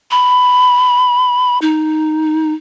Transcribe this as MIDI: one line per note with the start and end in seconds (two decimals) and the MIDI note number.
0.11 1.58 83
1.62 2.54 63